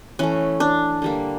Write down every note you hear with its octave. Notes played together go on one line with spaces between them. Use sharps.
E3 A3 C#4
D4
D3 G3 A#3